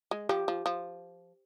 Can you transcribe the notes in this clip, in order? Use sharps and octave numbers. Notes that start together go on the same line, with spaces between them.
G#3
F3 G4
F3
F3